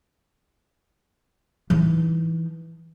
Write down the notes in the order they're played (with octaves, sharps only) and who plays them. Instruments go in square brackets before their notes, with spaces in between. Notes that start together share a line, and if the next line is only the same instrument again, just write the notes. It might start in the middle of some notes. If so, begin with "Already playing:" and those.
[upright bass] E3 D#4